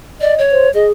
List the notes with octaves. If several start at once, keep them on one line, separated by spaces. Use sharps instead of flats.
D5 D#5
C#5
C5
G#4 D#5